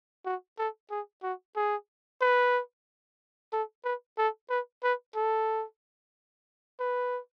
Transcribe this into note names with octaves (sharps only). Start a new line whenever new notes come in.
F#4
A4
G#4
F#4
G#4
B4
A4
B4
A4
B4
B4
A4
B4